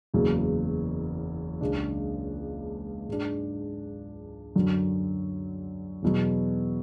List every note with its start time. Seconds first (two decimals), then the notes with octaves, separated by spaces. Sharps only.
0.14 F#1 E2 C#3 F#3
1.61 C#2 C#3 G#3 D4
3.09 G#2 G#3 D4
4.56 F#2 D3 F#3
6.02 E2 B2 F#3